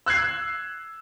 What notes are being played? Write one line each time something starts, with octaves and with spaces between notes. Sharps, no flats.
E6 F#6 G#6 C7